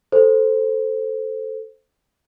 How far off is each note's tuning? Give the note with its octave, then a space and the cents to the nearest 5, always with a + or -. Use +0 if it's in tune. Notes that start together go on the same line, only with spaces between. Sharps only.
A4 +0 C5 +0